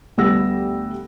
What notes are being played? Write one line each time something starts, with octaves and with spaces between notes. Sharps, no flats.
D2 G3 B3 G4 E6 A#6